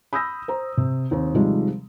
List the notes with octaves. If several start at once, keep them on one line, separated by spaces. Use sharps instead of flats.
B5 D#6 E6 G6 A#6
C5 A#5
C3
D#2 C4
C3 D#3 F3 G3 G#3